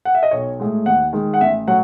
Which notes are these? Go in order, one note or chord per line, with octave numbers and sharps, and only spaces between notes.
F#5
E5
D#5
B1 C#5
A2 G#3
D#2 F#5
D#3 G#3
F#5
A1 E5
A2 F#3 F#5